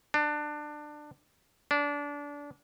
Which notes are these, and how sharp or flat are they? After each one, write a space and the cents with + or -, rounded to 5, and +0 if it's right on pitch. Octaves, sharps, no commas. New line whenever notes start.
D4 +20
D4 -25